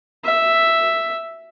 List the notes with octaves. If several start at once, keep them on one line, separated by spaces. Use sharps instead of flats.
E5